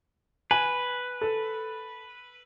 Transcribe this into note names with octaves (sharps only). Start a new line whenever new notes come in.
B4 G#5
A4